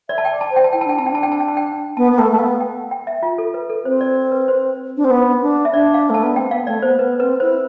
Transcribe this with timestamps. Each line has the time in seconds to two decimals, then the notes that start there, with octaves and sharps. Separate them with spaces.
0.09 D5 E5
0.18 A5
0.25 D5 G5
0.41 A5
0.50 C5
0.56 G5
0.64 A5
0.72 E4 G5
0.81 A5
0.85 D4 G5
0.98 C4 A5
1.06 G5
1.10 D4 A5
1.23 G5
1.32 A5
1.40 G5
1.48 A5
1.57 G5
1.97 B3 A5
2.11 B3
2.18 A3 G5
2.31 A3
2.38 B3 F5
2.60 G5
2.91 G5
3.07 E5
3.23 F4
3.38 A4
3.54 B4
3.70 A4
3.85 C4 C5
4.01 D5
4.32 B4
4.48 C5
4.96 D4
5.04 C4
5.10 B3
5.42 D4
5.65 E5
5.73 D4 D5
5.94 F5
6.09 A3
6.14 A5
6.23 B3
6.36 C4 G5
6.51 B3 F5
6.67 A3 D5
6.82 B3 C5
6.98 B3 B4
7.19 C4 B4
7.40 E4 C5